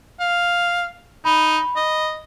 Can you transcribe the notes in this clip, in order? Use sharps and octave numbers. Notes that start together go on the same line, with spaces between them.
F5
D#4 B5
D#5